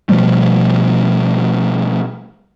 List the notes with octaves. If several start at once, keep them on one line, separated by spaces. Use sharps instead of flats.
B2 F3 G3 A3